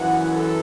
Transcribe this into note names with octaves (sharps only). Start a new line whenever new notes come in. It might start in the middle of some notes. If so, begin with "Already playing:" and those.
Already playing: F#2 E3 F#5
A4